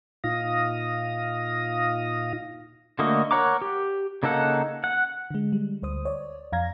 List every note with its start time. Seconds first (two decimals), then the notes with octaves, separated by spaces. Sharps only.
0.24 A#2 D#4 F4 F5 D#6 A#6
2.99 D3 A3 A#3 F#4 D#5
3.31 A#4 C#5 F#5 A#5 D6
3.62 G4
4.23 C#3 A#3 D#4 A4 F#5
4.84 F#5
5.31 D3 G#3
5.53 G3
5.83 D2 C5 D#6
6.05 C#5 D5
6.52 F2 F5 A#5 G#6 A#6